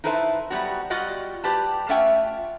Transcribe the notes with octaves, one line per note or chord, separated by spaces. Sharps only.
D#4 E4 A4 B4 C5 E5
F#3 G3 B3 F#4
G3 F4 F#4 D#5 F#5
G3 G4 B4 C5 A5
A3 C#4 F4 E5 F#5 G5